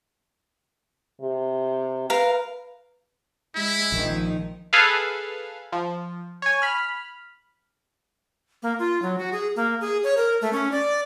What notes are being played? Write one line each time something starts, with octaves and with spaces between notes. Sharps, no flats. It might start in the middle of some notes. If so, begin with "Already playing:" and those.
C3
A#4 B4 F5
G#3 E4
A#1 D#3 F3 D#4
G#4 A4 B4 F5
F3
C#5 G#5
B5 F6
A#3
F4
F#3
F#4
G#4
A#3
G#4
C#5
A#4
A3
C#4
D5